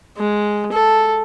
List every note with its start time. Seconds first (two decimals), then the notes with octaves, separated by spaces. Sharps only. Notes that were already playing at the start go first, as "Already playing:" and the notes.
0.17 G#3
0.72 A4